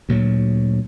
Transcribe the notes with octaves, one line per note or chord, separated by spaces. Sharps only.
D2 A#2 F#3